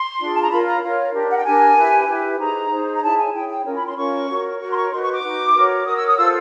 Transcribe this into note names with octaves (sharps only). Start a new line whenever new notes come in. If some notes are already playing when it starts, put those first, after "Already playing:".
Already playing: C6
D4 F4 G#4
A5
A#5
F4 A#4 C#5 B5
A#5
F4 A#4 C#5
D4 G4 A#4
F#5
G5
D4 G4 A#4 G#5
E4 G4 B4
E4 G4 B4
D#4 G#4 C5 A#5
D#4 G#4 C5
A#5
E4 G#4 C#5 A5
G#5
E4 G#4 C#5 G5
G5
C#4 F4 A#4 C#5
B5
C6
C#4 F4 A#4 C#5 C#6
F#4 A#4 C#5
F#4 A#4 C#5 C#6
C6
C#6
D#4 F#4 B4 C6
C#6
D6
D#4 F#4 B4
F#4 A#4 C#5
F#4 A#4 C#5 D#6
E6
D#6
F4 A4 C5 E6